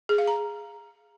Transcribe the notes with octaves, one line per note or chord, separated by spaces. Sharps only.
G#4
F5
A#5